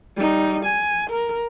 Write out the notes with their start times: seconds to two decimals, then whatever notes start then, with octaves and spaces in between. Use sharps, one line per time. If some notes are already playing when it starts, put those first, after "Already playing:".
0.16 G3 D#4
0.66 G#5
1.10 A#4